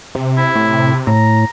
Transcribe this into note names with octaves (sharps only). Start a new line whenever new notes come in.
C3
E4
A2
A2 A#5